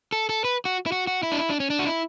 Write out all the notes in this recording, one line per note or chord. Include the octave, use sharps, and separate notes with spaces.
A4
A4
B4
F#4
E4
F#4
F#4
E4
D4
E4
D4
C#4
D4
F#4
E4